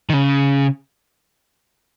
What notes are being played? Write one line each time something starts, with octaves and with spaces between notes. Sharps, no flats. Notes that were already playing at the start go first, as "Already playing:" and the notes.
D#3
C#3